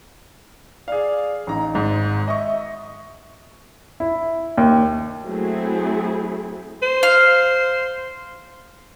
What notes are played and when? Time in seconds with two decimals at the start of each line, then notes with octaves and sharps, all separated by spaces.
0.88 G#4 D5 F5
1.47 A1 D#4 A#5
1.74 G#1 G#2
2.28 D#5 E5 C#6
4.00 E4
4.58 D#2
5.26 F#3 A3 C4 E4 G#4
6.83 C5
7.03 F5